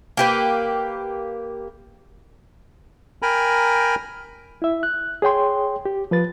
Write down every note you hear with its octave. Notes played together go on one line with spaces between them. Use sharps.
A#3 G4 B4
A#4 G5 G#5 A#5 B5
E4 E5
F#6
G#4 C#5 G5 C6
G4
F3 B4 A6